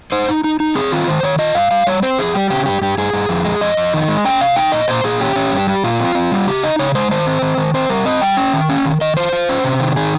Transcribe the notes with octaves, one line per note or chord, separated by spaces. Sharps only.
D#4 C5
D#4
D#4
D#4
C4 G#4
D#3 F4
D#3 C5
D#3 C#5
F4 D#5
G2 F5
G3 F5
G3 C#5
C4 C5
F2 G#4
G3 G4
C#3 G4
G2 G4
G2 G4
G2 G#4
G2
F2
G#3
F2 D#5
F2
D#3
G#3
C#4 G5
C3 F5
D#4 G5
A#2 D#5
A#2 C5
A#2 G#4
C#4 G4
C#4
G2
G3
A#2 F4
C4
C4
G3
C#3 G4
D#4 D#5
C#3 C#5
G#3 C5
D#3 C5
C4
D#3
D#3
C4 C5
G3 A#4
C4 D#5
G3 G5
C#4
D#3
C#4
D#3
D#3 D#5
F4 C5
F4
C#4
C3
D#3
D#3 G#4